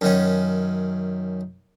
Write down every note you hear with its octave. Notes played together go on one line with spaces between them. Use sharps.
F#2 D#3 C#4